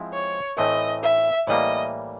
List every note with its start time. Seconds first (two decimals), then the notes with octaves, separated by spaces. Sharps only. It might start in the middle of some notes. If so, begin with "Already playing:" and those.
Already playing: F3 G#3 C4 E4
0.13 C#5
0.57 A2 E3 A3 C4 D#5
1.03 E5
1.47 A2 E3 G3 A#3 D#5